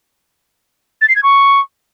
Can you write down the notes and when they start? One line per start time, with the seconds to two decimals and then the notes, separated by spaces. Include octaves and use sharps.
1.01 A6
1.08 C7
1.16 G#6
1.23 C#6